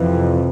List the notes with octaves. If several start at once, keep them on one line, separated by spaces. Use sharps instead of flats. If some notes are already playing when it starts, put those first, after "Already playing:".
Already playing: F2 C3 E3